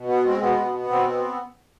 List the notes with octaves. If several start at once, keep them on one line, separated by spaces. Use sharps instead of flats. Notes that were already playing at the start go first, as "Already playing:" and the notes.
Already playing: B2
B3
G#3 C4
B2 B3
B2
B3
B2 C4
B3